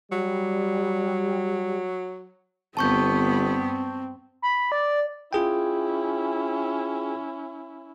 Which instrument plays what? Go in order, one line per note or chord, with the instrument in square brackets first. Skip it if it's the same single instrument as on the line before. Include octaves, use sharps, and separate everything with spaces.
[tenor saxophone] F#3 [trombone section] G3
[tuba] G1 [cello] G2 B3 [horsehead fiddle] C4 [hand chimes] A5 C#6 G6
[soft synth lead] B5
D5
[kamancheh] C#4 E4 [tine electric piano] F4 G#4 G5